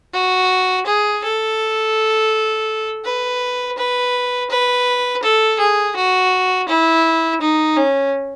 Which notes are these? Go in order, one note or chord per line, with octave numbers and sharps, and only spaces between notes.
F#4
G#4
A4
B4
B4
B4
A4
G#4
F#4
E4
D#4
C#4